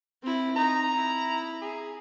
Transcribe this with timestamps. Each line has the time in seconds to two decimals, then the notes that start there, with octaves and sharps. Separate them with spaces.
0.22 C4 E4
0.56 D#4 A#5
0.96 E4
1.62 G#4